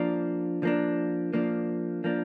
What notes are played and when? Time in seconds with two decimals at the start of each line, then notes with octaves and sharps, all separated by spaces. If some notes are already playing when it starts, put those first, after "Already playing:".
Already playing: F3 A#3 D4
0.63 F3 A#3 D4
1.33 F3 A#3 D4
2.04 F3 A#3 D4